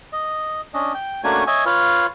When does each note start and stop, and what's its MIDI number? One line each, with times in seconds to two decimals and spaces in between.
0.13 0.61 75
0.74 0.93 61
0.74 0.93 62
0.74 0.93 75
0.94 1.21 79
1.24 1.44 57
1.24 1.44 58
1.24 1.44 61
1.24 1.44 62
1.24 1.44 66
1.24 1.44 80
1.47 1.64 73
1.47 1.64 75
1.47 1.64 76
1.47 1.64 80
1.66 2.06 65
1.66 2.06 71
1.66 2.06 73
1.66 2.06 77